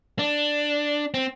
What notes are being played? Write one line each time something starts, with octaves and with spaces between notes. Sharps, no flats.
D4
C4